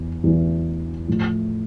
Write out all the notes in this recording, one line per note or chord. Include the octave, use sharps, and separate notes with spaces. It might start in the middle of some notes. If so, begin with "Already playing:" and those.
Already playing: E2
E2 E3
A2 F3